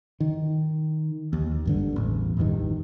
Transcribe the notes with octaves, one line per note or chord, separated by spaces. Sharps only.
D#3
D#2
G#1 G2 D3
A1 E2
A1 E2 G2 D#3